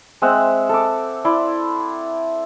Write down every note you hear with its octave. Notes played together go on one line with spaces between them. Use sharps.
G#3 C4 E5 F#5
A4 D6
E4 D5 C6